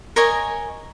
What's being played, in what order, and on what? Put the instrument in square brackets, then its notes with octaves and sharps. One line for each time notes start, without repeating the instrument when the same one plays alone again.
[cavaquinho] A#4 C#5 D#5 G#5